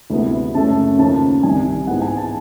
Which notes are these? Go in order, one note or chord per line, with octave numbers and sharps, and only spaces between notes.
D2 C3 E3 G#3 B3
F#2 C#3 F#3 A3 A5
D#2 C#3 F3 A#3 A5
C2 C3 D#3 G3 G#5
G#2 E3 G#3 B3 F#5
G#5
A5